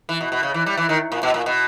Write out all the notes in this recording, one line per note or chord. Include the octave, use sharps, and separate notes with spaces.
E3
B2
B2
C#3
E3
G3
E3
D#3
A#2
B2
A#2
B2